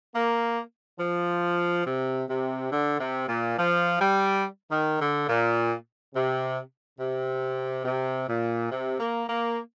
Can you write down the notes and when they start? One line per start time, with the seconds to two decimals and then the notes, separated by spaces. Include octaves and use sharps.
0.14 A#3
0.99 F3
1.86 C3
2.28 C3
2.71 D3
3.00 C3
3.28 A#2
3.57 F3
4.00 G3
4.71 D#3
5.00 D3
5.28 A#2
6.14 C3
6.99 C3
7.85 C3
8.28 A#2
8.71 C3
9.00 A#3
9.28 A#3